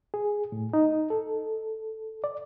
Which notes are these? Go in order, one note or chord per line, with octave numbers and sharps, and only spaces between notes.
G#4
A2
D#4
A4
D5